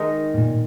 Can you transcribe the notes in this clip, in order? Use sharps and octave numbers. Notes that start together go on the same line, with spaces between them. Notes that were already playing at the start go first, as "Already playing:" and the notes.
Already playing: D#3 G#3 D#4 A#4
G#2
A#2